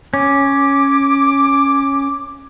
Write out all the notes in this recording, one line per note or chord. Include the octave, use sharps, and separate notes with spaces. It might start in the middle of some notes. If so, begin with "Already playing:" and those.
C#4 D6